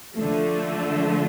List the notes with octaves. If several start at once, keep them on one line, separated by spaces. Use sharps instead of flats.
D3 F3 A3